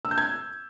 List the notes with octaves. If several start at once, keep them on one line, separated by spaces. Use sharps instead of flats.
E6
G6
G#6